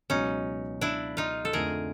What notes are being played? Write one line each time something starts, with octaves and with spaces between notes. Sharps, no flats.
C#2 B2 F#3 C#4 D#4
D4 E4
D#4 F4
A4
F2 D3 F3 A3 G#4 A#4